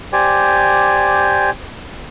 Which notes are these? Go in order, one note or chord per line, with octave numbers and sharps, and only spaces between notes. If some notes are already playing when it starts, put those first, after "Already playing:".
G4 C5 D5 G#5